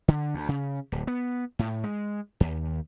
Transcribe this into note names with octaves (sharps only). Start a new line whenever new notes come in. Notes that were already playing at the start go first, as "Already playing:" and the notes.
D3
D2
C#3
D1
B3
A2
G#3
D#2